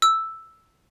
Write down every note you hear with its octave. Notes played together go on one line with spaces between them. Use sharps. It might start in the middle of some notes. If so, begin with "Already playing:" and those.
E6